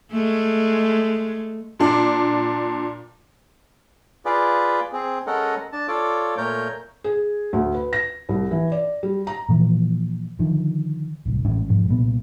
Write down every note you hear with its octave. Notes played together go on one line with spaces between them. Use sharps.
G#3 A3
A#2 D4
F4 G#4 B4 D5
C4 G#4
G#3 C#4 A4 A#4 D#5 F#5
D4 A5
F4 A4 C#5 D5 D6
A#2 A3 A#4 C#5 G6
G#4
D2
B4
A#6
C2
E3
D5
G3
A#5
A#2 E3 F3
D3 D#3 F3
D1 C2
A1 G#3 C#4
E1 G#2 F3 G#3
C2 A#2 B3